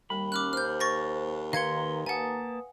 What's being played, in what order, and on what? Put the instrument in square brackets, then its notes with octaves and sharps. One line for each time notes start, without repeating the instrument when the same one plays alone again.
[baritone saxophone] D#2 [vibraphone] G3 [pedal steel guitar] B5
[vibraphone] C#4 [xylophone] D6 F6 F#6
[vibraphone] C5 [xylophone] F6 G6
[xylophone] C#6 A6 A#6
[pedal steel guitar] D#3 C6 [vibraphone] B4 [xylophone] F5 G#6 C#7
[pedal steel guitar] A#3 A5 [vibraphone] B4 D#6 [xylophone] F#5 G#5